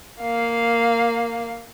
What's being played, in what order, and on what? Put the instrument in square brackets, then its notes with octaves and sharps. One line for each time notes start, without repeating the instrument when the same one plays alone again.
[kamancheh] A#3 F5